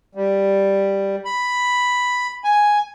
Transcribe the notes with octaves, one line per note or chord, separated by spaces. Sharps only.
G3
B5
G#5